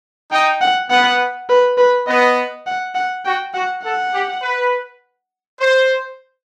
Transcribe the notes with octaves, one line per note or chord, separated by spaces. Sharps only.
D#4 G5
F#5
B3 F#5
B4
B4
B3 D#5
F#5
F#5
F#4 G5
F#4 F#5
A4 F#5
G4
B4
C5